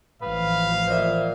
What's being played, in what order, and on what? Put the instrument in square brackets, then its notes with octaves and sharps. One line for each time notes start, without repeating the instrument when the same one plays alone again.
[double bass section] A1 E3 F3 [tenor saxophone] B4 [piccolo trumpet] F5
[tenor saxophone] A#2 [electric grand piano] C5 D#5 E5